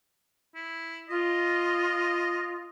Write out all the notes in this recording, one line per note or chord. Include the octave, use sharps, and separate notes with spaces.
E4
F4 D#5